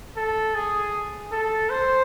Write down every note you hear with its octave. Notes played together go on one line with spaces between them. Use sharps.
A4
G#4
A4
C5